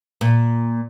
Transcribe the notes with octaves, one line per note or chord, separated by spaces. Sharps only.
A#2